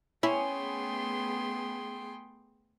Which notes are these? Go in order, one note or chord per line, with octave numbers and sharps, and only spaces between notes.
A3 B3 C#4 E4 G#4 G5 C6